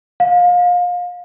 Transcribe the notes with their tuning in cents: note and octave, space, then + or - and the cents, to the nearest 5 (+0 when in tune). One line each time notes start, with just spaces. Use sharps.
F5 +30